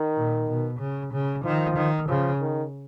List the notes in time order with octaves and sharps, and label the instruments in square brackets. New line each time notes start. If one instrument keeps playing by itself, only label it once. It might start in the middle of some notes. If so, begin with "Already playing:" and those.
Already playing: [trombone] D#3
[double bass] A#2
B2
C#3
C#3
[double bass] D#3 [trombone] F3
[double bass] D#3
[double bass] C#3 [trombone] F3
[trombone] D#3